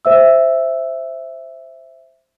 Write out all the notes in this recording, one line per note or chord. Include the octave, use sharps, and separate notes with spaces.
C5 E5 E6